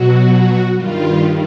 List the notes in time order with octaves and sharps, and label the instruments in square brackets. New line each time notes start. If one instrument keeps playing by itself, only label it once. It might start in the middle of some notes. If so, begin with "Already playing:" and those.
Already playing: [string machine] B2 F#3 F#4
G2 D#3 G3 F4